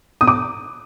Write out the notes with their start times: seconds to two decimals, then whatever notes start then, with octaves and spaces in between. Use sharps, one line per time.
0.21 D#6
0.27 D6